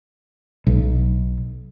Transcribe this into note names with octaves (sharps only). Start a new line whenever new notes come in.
B1